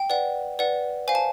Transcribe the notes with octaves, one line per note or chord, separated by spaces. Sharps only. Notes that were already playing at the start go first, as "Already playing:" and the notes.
Already playing: G5
B4 D5 F#5
B4 D5 F#5
C5 F5 G#5
A5